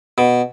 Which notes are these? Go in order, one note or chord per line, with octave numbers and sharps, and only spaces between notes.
B2